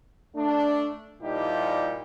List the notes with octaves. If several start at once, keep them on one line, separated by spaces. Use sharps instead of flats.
A3 D4
A#2 F3 G3 D#4 E4 G4